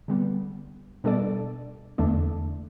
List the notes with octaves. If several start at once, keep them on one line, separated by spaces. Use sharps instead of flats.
D3 G3 B3
B2 G3 D4 A4 D5
E2 D3 A3 D4